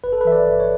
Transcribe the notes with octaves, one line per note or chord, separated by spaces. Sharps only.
G1 B4
A4
B4
E3 E5
D5
G1
C#5